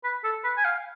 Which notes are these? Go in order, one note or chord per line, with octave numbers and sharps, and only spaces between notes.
B4
A4
B4
G#5
F5